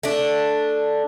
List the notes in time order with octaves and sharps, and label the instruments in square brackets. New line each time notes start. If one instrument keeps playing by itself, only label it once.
[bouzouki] A3 D4